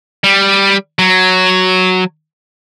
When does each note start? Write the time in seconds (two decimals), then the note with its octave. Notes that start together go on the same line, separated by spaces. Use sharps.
0.24 G3
0.99 F#3